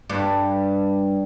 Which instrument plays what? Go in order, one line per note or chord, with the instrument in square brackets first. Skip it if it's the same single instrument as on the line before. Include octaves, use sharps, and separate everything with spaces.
[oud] G2